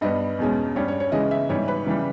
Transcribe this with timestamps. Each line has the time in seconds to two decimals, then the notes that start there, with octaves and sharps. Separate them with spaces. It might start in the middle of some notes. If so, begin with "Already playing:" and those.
0.01 G2 G3 B3 D#5
0.38 E2 B2 G#3 C#4
0.76 G2 G3 C#4 C#5
0.88 C#5
1.00 C#5
1.12 C#3 E3 G#3 C#4 D#5
1.31 E5
1.49 G#2 E3 G3 C#5
1.68 B4
1.86 C#3 E3 G3